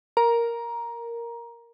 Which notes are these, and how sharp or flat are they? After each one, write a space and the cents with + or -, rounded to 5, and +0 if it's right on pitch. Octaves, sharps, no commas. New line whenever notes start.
A#4 +0 A#5 +15